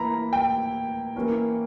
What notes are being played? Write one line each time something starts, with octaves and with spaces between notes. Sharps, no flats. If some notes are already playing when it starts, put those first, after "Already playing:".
Already playing: E3 A#3 E4 A#5 B5
G5
E3 A#3 C#4 E4